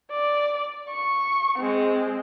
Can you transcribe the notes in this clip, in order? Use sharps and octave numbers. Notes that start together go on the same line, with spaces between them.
D5
C#6
G#3 C4